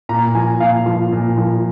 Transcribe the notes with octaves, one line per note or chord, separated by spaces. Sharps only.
A#2 A#5
F3 G#5
A#2 F5
F3
A#2
F3